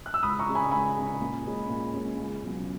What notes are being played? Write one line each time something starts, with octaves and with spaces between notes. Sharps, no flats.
F#6
E6
C#2 B5 D#6
A#5 C#6
C#3 G#3
G#5 B5
C#2 G#5 B5
C#3 G#3
A#2
G#3 C#4
A#2
G#3 C#4
C#2
B2 F#3 C#4